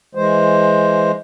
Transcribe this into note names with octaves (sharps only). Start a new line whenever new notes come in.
E3 G#3 C5